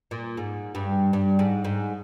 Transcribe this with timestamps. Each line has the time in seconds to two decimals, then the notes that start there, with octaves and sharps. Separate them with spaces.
0.11 A#2
0.37 G#2
0.75 G2
1.13 G2
1.39 G#2
1.64 G#2